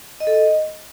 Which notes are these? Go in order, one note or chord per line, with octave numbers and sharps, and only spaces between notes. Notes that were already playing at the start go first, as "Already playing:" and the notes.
D#5
A4
D#5